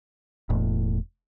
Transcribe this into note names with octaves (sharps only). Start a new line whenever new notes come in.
E1 A2